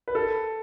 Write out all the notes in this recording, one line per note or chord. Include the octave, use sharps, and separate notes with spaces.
B4
A4